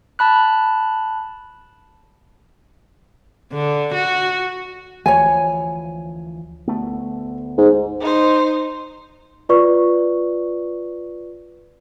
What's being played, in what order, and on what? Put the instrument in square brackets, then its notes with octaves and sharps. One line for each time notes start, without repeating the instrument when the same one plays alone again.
[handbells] A5 B5 F#6
[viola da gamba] D3
F#4
[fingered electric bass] D2 E3 F3 [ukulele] C#5 G#5
[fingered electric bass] D2 A3 B3
[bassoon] G#2
[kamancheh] D#4 C5
[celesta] F4 B4 D5 C#6